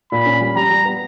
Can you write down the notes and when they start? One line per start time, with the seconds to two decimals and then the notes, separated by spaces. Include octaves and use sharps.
0.12 A#2 B5
0.26 C#4
0.41 G3
0.56 G3 A#5
0.70 G3
0.85 B3